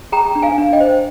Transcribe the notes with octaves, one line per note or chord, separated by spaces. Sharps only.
G#4 G5 A#5
D4
F5 G#5
D4
D#5 G5
C5